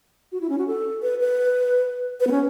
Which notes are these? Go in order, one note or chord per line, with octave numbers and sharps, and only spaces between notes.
F#4
E4
C#4
F#4
A4
B4
B4
B4
B3
C#4